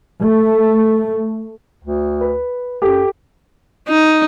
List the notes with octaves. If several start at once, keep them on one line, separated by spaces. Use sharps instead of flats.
A3
D2
B4
F#2 G4 A4
D#4